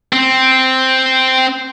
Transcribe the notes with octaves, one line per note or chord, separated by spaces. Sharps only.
C4